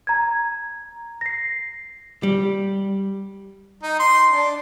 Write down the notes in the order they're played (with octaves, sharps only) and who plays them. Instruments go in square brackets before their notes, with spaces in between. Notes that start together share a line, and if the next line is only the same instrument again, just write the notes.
[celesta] A#5 G#6
A#6 C7
[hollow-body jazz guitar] G3
[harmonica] D#4
C6
D4